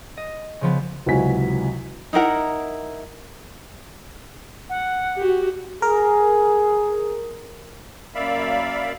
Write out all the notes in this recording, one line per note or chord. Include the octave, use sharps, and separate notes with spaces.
D#5
C#3 F3 B3
C#2 C3 E3 F#3 G#5 B6
D#4 E4 A#4 F#5
F#5
F#4 G4
G#4 A#4
F#2 A#3 D5 E5 F5 B5